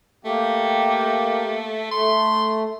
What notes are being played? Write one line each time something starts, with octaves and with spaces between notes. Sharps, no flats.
A3 A#3 G4
A3 C6